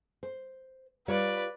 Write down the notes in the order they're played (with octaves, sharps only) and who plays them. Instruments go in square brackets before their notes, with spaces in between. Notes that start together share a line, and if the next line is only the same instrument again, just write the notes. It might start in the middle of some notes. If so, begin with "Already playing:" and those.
[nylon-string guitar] C5
[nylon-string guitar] G3 F4 C#5 [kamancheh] B4 D5